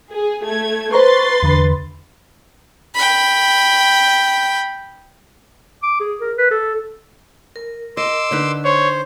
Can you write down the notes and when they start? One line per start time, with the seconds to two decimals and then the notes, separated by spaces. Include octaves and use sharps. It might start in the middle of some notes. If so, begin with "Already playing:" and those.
0.11 G#4
0.44 A3 G#6
0.92 B4 C5 A#5 C6 C#6 A6
1.43 E2 D3 B5
2.94 G5 B5
5.83 D6
6.00 G#4
6.21 A#4
6.38 B4
6.51 A4
7.56 A#4
7.97 D#5 C6 D6 E6
8.31 D3 D#4 B4
8.65 C5 C#5